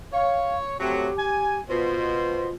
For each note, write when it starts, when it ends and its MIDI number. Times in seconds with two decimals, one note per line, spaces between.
0.13 0.74 73
0.13 0.57 77
0.80 1.09 54
0.80 1.09 57
0.80 1.09 60
0.80 1.59 67
1.18 1.59 80
1.69 2.50 47
1.69 2.54 65
1.69 2.50 72